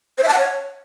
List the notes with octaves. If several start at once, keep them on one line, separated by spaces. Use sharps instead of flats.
C5
E5
A5
F#5
C#5